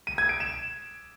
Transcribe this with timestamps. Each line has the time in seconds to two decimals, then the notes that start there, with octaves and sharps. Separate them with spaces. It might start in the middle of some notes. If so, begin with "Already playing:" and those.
0.07 D#7
0.18 G#6
0.29 D7
0.40 E7